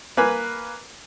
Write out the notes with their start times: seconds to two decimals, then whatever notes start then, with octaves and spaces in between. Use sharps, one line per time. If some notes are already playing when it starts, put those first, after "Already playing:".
0.17 A#3 B4 G#5